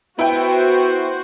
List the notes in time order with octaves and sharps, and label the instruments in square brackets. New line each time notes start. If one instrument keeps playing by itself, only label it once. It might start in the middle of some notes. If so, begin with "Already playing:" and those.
[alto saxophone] B3 [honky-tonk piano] E4 G5 [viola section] F#4 C5